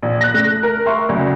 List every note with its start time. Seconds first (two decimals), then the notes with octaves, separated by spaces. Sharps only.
0.02 A#1
0.21 F#6 A#6
0.34 A3
0.63 A#4
0.86 E5 C6 C#6
1.09 D2 C#3 F#3